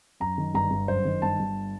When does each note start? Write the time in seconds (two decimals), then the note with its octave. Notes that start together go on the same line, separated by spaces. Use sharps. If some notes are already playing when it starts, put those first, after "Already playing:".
0.20 F#2 A#5
0.38 D#3
0.54 G1 A#5
0.71 G1
0.88 F#2 C5
1.05 D#3
1.22 G1 A5
1.40 G1